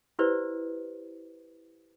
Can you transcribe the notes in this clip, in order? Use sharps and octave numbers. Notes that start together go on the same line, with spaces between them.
E4 G4 B4 C5 D5